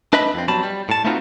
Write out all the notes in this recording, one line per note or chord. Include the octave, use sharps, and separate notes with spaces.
D4 B4 D#5 E5 B5
F2 C4
B2 F#3 G3 A5 B5
G3
A2 A5
A3 B3 C4 D#4 F4 F#4